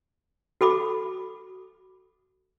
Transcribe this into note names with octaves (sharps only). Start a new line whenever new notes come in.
F#4 A4 B5 D6